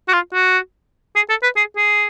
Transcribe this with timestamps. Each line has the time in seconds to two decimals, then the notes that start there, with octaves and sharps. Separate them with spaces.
0.08 F#4
0.13 F4
0.34 F#4
1.16 G#4
1.30 A4
1.43 B4
1.56 G#4
1.77 G#4